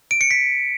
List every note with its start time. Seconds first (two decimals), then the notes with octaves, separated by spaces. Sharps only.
0.11 D7
0.21 C#7
0.31 B6